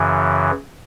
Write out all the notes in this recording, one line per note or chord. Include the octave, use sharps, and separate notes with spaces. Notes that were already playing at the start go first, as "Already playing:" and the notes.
Already playing: F#2 C#3 E3